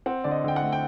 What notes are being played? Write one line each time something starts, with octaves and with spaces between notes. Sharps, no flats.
C4 F#5
D3 D5
D#5
D3 G5
F#5
A3
G5